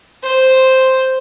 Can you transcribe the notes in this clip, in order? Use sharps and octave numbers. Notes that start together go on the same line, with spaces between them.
C5